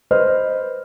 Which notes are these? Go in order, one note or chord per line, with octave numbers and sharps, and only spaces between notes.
B4 C5 D#5 F6